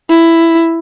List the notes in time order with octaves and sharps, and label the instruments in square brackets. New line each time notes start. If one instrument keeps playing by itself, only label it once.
[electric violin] E4